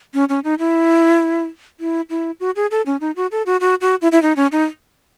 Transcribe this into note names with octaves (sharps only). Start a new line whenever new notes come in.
C#4
C#4
D#4
E4
E4
E4
F#4
G#4
A4
C#4
D#4
F#4
A4
F#4
F#4
F#4
E4
E4
D#4
C#4
D#4